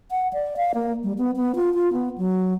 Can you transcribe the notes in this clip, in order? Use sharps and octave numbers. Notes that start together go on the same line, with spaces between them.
F#5
D5
F5
A#3
G3
B3
B3
F4
F4
B3
F#3